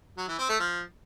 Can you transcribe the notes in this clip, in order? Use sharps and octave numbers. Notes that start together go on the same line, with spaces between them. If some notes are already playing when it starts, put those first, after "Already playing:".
F#3
E3
C4
A3
F3